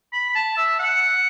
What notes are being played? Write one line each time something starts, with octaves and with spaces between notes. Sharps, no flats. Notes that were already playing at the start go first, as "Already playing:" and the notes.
B5
A5
E5
F#5